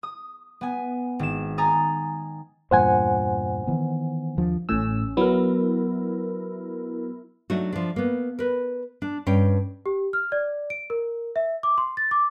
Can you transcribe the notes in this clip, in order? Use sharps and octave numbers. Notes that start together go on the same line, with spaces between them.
D#6
B3 G#5
G#1 E7
G#5 A#5 D#6 A6
E2 G2 A#2 C5 F#5 G#5
D#3 E3 B3
D#2 F3 D4
A1 A2 C#4 E6
F#3 B3 E4 A#4
F#3 A3 D4 D#4 F#4
F3 D4
A#3 B3
A#4 B4
D4
G2 C#4 G5
G4
F6
D5
D7
A#4
E5
D6
C6
A6
D6